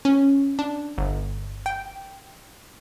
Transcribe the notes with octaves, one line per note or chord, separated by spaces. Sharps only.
C#4
D4
G1
G5